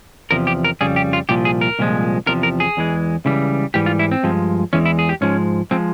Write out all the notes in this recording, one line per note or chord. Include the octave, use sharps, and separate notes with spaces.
E2 C3 F3 A#4
G4
A#4
F2 C#3 G3 G#4
G4
F4
C2 A#2 F3 G4
G#4
A#4
C2 A#2 F3 G#3
E2 C3 F3 A#4
A#4
G#4
E2 E3 G#3
C#2 C#3 E3 G3
G#2 E3 G3 G4
F4
E4
C4
G2 F3 G#3
E2 E3 G#3 C#4
E4
G#4
G4
G#2 F3 G#3 C#4
F3 G#3 C4